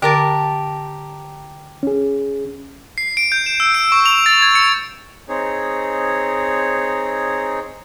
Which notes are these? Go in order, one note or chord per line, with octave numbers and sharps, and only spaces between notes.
D3 G4 A#4 A5 D6
C#4 G#4
C7
D7
G6
E7
E6
D7
C#6
F7
A6
G#6
C#7
C4 D#4 G#4 C#5